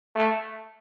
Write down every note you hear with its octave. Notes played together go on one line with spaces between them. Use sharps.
A3